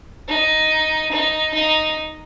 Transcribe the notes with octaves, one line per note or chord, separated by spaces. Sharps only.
D#4
D#4
D#4